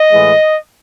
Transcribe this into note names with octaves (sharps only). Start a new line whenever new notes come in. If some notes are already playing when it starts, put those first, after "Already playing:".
Already playing: D#5
A2 E3 G#3